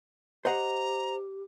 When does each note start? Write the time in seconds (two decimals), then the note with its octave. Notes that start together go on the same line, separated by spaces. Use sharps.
0.45 G4 C5 D#5 F#5 A#5